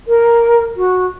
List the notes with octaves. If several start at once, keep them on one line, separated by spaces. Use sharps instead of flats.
A#4
F#4